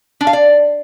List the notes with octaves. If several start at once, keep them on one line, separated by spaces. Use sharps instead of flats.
D4
F5
D5